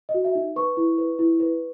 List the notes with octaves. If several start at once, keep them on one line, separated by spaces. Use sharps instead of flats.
D#5
F#4
E5
D#4
B4 C#6
E4
B4
E4
B4